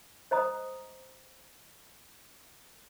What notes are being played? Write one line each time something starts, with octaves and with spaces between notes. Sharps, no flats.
C5 D#5 A#5 D#6